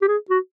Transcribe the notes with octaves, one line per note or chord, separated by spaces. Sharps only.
G4
G#4
F#4